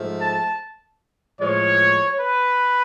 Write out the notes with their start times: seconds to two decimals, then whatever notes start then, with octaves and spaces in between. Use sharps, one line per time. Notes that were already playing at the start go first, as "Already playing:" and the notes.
Already playing: G#2 F3 A3
0.20 A5
1.40 A2 F3 G#3 C#5
2.19 B4